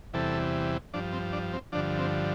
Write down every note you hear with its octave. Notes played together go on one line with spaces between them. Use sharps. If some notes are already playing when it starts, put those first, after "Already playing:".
E2 C3 E3 G3 A4
G2 F3 D4
C4
D4
C4
G2 D3 F3 D4
C4